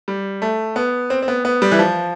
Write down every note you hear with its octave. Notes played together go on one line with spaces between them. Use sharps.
G3
A3
B3
C4
C4
B3
B3
G3
E3
F3